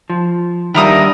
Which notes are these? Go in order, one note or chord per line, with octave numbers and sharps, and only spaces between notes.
F3
D#3 G3 D4 E4 A#4 D#6